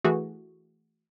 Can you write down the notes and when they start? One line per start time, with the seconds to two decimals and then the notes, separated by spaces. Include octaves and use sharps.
0.04 E3 A3 F#4 G#4